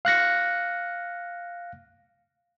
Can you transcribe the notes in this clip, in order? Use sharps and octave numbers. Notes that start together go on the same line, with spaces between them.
F5 F#6 A#6 C#7